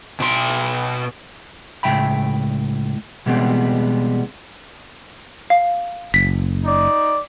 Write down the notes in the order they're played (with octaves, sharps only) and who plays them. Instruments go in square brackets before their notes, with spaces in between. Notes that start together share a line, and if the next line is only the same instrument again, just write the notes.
[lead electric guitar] B2 C6
[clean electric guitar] C#2 A2 F3 E5 G5 B5
B2 E3 G3 G#3 B3 C4
[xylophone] F5
[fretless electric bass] F#1 [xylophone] B6
[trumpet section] D#4 D5